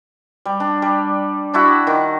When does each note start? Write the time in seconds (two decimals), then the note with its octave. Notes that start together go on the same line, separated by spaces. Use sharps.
0.45 G3
0.60 D4
0.82 G3
1.54 D4 E4 F#4 E5
1.87 D#3